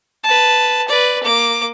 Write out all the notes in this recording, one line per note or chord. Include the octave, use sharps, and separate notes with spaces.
B4 A5
B4 D5
A#3 D6